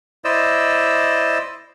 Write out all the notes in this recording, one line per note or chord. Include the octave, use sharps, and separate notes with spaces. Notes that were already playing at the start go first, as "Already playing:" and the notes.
E4 C5 D5 D#5 E6